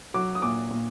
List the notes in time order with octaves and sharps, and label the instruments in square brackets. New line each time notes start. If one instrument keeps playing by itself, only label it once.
[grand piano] F#3 D6
D#6
A#2 D6
A#2